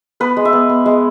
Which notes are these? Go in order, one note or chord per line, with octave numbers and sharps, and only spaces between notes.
B3 B4
G#3
E5
B3
B3
G#3